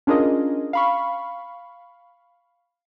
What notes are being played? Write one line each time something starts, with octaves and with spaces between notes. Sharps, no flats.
C#4 D4 F4 G#4 A#4 D#5
F5 B5 C#6